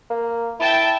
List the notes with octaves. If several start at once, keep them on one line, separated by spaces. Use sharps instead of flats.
A#3
E4 E5 G5 A5